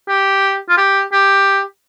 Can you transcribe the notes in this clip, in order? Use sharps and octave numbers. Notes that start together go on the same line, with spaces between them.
G4
F4
G4
G4